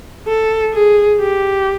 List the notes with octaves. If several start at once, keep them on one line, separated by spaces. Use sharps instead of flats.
A4
G#4
G4